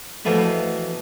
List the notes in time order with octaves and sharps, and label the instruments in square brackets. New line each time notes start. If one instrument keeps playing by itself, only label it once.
[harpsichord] B2 E3 F3 A3 B3